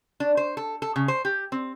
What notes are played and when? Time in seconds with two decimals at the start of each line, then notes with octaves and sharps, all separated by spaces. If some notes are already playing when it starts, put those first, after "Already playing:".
0.20 D4
0.37 C5
0.57 A4
0.82 A4
0.96 C#3
1.08 C5
1.25 G4
1.52 C4